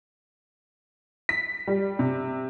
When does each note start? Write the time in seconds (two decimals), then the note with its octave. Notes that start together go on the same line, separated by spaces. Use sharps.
1.29 B6
1.67 G3
1.99 C3